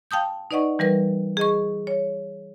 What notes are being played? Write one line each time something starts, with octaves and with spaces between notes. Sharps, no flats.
F5 G5 A5 D#6 G6
D#4 B4 D5 D#5 F#5 C#6
E3 G3 A#4 B4 A#6
G#4 D#5 C#6
C#5